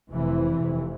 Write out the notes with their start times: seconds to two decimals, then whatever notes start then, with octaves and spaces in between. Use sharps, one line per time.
0.11 F1 F2 C3 E3
0.60 F1 F2 C3